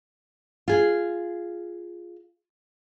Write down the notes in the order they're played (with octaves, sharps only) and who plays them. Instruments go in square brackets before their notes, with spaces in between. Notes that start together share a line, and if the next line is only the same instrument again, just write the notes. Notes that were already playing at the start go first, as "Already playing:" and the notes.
[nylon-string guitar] F4 G#4